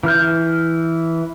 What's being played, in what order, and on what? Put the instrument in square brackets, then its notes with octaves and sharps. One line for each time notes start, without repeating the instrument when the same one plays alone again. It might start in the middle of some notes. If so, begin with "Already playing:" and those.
[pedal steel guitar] E3 E4 F6 G6